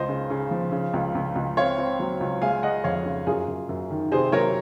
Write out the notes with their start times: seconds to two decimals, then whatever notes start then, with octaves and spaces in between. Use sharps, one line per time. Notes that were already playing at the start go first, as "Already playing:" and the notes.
Already playing: C#2 C5 D#5
0.09 C#3
0.30 C#3
0.51 F3
0.72 C#3
0.93 C#2
1.15 C#2
1.35 C#2
1.57 C4 C#5 F5
1.78 C4
2.00 F#3
2.21 C#2
2.42 G#3 F5 G#5
2.63 G#3 D#5 F#5
2.84 F2 C#5 F5
3.06 C#3
3.26 F#2 F4 G#4
3.48 F#2
3.69 F#2
3.90 D#3
4.12 C3 G#4 C5
4.32 F#3 A#4 C#5